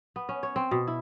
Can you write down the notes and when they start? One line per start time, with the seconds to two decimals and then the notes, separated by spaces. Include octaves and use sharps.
0.16 B3
0.29 C#4
0.43 C#5
0.56 C4
0.71 B2
0.87 E4